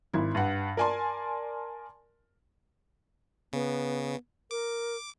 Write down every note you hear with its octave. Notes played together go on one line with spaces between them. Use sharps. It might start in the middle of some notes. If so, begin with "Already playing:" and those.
G#1 E4
G2 F#5
A#4 D5 G#5 A5 C6
C#3 B3
A#4 D6